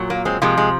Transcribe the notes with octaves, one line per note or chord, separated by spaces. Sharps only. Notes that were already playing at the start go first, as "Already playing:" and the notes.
Already playing: A#2 F#3
A#3
G#3 C4
C3 F3 G#3 A#3
G#3